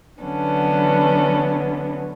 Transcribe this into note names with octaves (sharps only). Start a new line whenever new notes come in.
D3 E3 F#3 B3 C#4 D4